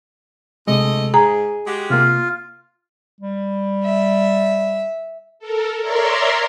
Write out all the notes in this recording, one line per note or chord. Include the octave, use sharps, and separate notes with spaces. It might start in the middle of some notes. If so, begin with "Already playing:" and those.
D2 C3 G#3 A3 D#5
G#2 G#4 A#5
G#3 F#4 G4
C3 A#3 F4
G3
E5
A4 A#4
A#4 C#5 D5 E5 A#5 C6